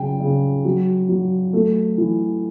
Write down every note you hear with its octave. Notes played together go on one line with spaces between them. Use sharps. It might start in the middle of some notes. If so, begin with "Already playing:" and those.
Already playing: C#3 F#3 G5
C#3
F#3
F#3
A3
E3